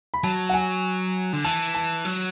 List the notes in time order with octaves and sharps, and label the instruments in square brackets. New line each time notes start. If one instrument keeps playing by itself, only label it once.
[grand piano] B5
[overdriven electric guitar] F#3 [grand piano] A5
[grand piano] F#5
G#5
[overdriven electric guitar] D3
[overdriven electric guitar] E3 [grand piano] A5
[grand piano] A5
[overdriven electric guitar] F#3